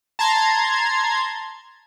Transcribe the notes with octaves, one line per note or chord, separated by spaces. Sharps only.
A5 A#5 C6 G#6